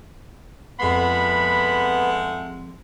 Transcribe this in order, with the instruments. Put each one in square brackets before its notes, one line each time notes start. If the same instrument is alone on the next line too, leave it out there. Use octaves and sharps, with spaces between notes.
[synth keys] F2 C6 [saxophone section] G#3 A3 F#5 [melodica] B3 [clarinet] B5